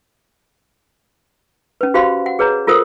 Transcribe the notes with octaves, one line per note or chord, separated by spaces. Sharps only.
C#4 B4
F#4 G4 C5 F5 B5 C6
F#5
G#4 B4 C#5 A#5
F4 A4 A#4 C5 D#6